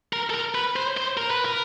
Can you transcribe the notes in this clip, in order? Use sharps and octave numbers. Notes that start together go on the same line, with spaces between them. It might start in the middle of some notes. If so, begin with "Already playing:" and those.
A#4
A4
A#4
B4
C5
C5
A#4
B4
A#4